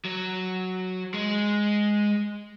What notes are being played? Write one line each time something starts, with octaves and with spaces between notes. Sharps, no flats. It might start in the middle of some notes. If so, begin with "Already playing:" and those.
F#3
G#3